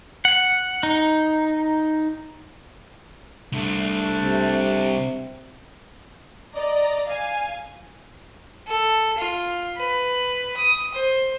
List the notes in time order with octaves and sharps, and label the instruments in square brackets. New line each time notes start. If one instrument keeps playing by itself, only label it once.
[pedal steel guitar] F#5
D#4
[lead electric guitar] C2 [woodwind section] A3 D4
[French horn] C3
[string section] D5 D#5 A#5
F5 G#5
[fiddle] A4
F4
B4
D#6
C5